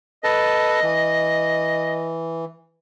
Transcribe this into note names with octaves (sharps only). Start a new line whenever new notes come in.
A4 B4 D#5 A5
E3